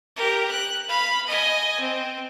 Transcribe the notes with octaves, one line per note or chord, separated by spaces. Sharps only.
G4 A#4
F#6
F5 B5
D#5 G#5
C4